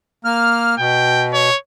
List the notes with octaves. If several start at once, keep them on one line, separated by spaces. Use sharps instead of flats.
A#3 F6
B2 G5
C#5